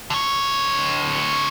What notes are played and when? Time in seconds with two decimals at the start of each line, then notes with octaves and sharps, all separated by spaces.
0.10 D3 C#5